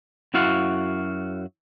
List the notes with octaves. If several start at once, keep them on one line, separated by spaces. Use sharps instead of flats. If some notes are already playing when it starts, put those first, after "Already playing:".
F#2 E4 F#4 F5 F#5